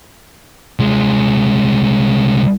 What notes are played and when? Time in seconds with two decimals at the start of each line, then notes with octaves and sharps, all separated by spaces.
0.79 C2 G#3